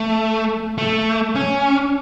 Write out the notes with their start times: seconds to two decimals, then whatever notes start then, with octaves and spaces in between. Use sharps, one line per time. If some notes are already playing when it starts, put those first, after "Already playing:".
Already playing: A3
0.78 A3
1.35 C#4